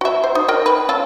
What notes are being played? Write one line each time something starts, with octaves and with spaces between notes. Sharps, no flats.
F#4 E5
C5
D#4
A#4 D#5 G5
B4
C#4 F4 A4